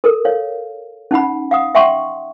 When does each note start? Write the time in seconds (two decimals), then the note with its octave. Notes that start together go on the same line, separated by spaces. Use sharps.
0.04 A4 A#4
0.25 C#5 F5
1.11 C#4 D#4 F#5 B5
1.51 F5 F#5 D#6
1.75 E5 F#5 G5 C6 C#6